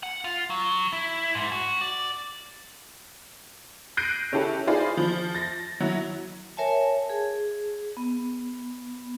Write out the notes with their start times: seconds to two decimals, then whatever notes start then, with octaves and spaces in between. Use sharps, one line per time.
0.03 F#5
0.24 F4
0.50 F#3
0.93 E4
1.35 G#2
1.52 F#4
1.81 D5
3.97 F#6 G6 A#6 C7 D7 D#7
4.32 C#3 C#4 E4 G4 A4
4.67 D#4 F4 G#4 C5 D5 B5
4.97 F3
5.34 A6 A#6
5.80 F#3 E4
6.57 A#4 C#5 E5 G#5 A5
7.10 G#4
7.97 B3